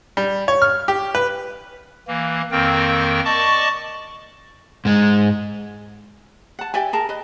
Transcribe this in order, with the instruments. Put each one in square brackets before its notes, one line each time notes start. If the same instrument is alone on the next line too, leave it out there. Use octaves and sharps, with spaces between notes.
[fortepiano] G3
C#5
F6
G4
B4
[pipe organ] E3 A#3
F2 D#3 A#3 C4 A#4 G5
D5 D#5 A5 C#6 D6
[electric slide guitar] G#2 G#3
[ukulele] F#5 A5
G4 D5 E5 G#5
G#4 A#4 A5
B4 D#5